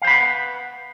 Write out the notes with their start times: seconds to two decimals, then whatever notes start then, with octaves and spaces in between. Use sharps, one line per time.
0.02 F5
0.04 C5
0.07 B5
0.10 F#5
0.13 B4